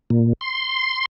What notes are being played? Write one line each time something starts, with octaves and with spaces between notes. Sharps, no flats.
A#2
C6